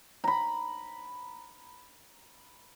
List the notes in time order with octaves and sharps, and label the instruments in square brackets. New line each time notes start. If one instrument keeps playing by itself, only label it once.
[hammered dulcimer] A#5 B5